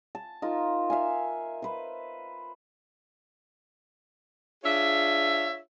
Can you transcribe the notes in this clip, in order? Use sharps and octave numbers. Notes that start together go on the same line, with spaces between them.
A5
D#4 F4 A#4
E5 F5 G#5
B4 C5
D4 F4 G#4 C#5 E5